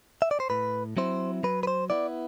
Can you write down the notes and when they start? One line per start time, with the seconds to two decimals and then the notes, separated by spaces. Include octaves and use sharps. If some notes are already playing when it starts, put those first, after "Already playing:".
0.22 E5
0.31 D5
0.40 C5
0.50 A2 B4
0.97 F#3 C4 E4 C5
1.43 F#3 B4
1.63 B4
1.67 C5
1.90 B3 E4 D5